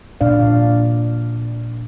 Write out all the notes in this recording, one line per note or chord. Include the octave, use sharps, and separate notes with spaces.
A#2 D4 D5 F5